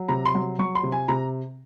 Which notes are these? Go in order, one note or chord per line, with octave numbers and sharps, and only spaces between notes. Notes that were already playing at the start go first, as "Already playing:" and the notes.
Already playing: F#3
C3 A#5
C6
F#3
F#3 C#6
C6
C3
G#5
C3 A#5